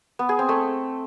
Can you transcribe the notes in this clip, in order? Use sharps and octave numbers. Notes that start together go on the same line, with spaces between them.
B3
G#4
C4
A3